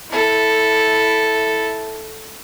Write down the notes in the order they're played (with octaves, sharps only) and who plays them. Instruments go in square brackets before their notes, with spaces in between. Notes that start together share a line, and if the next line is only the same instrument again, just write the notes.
[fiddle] E4 A4